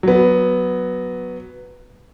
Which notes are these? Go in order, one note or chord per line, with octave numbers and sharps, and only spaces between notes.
F#3 B3